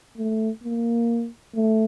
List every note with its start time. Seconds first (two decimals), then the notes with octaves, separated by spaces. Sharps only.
0.18 A3
0.64 A#3
1.56 A3